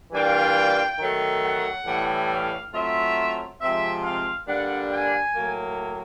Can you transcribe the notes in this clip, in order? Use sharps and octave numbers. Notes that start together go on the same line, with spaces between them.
E3 G3 A#3 D4 F4 G5
D#3 F#3 A3
F#5
A2 E3 G3
F5
F#3 A3 C4 F4 E5
C3 F3 G#3 C4 E5
F5
D3 G3 A#3 D4 F#5
G#5
A2 F#3 A#3